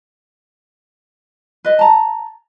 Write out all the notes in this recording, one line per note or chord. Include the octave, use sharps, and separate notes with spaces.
B4 D#5
A5 A#5